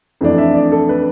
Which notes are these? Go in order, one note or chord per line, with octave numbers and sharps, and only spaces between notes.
F2 E3 A3 D4
E5
D5
A4
B4